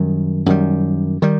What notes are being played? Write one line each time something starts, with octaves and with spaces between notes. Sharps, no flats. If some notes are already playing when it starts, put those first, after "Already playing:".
Already playing: F#2 D#3 G3
F#2 D#3 G3
D#3 G3